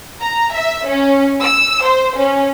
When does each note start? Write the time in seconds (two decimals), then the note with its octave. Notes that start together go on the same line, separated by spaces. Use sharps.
0.21 A#5
0.57 E5
0.88 C#4
1.42 E6
1.84 C5
2.18 C#4